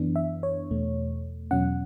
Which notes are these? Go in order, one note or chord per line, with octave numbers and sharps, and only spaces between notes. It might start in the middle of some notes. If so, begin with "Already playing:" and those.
Already playing: F#2 E3 B3 D4
E5
C#5
E2 B2 A3
E2 B2 F#3 C#4 F#5